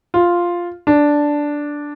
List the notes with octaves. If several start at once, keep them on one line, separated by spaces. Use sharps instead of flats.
F4
D4